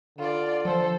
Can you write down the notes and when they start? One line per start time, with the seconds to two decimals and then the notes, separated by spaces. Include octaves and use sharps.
0.18 D3 F4 D5
0.65 F3 A4 C5